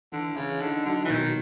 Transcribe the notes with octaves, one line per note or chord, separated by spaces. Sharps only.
D3 E3
C#3 E3
D3 D#4
D3 F#3
E3
B2 D#3